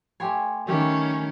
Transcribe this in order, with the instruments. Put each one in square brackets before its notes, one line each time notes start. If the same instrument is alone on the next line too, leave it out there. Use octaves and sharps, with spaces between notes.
[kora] A3 G4 C#5 [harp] G#5 C6
[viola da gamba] D#3 [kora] G3 A3 G4 [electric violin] C#4